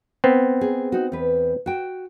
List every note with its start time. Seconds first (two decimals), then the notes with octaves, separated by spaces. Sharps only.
0.24 B3 C4
0.61 G#4
0.92 D#4 F#4
1.12 E2 B4
1.66 F#4 G5